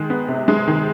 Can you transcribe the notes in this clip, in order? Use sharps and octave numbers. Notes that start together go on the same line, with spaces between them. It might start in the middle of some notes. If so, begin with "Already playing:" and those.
Already playing: D#3 G#3
B3
C3
G#3
D#3